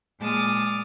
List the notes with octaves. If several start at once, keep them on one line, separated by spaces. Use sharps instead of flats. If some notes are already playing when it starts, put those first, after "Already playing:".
A#2 G#3 A5 D6 D#6 F6